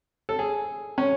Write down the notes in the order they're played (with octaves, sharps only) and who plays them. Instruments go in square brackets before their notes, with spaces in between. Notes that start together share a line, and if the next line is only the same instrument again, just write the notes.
[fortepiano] A4
G#4
C#4